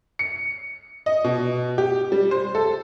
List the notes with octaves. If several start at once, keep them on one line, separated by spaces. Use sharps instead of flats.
C#7
D#5
B2
G4
G3
C5
A4